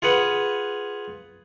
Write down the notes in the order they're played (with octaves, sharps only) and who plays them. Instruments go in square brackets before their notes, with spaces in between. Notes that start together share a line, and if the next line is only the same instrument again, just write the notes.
[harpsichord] F4 G#4 B4 F#5